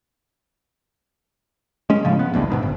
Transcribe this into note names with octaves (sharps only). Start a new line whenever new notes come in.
G#3 C#4
A2 C#3 F3
B3
A1 D2 G2
F1 G#2 B2 D#3
G1